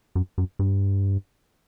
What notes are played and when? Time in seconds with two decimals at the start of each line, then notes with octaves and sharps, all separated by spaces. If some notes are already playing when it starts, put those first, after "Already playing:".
0.15 F#2
0.38 F#2
0.59 G2